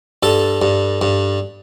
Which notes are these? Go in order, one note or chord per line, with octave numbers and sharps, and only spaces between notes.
G2 A4
G2
G2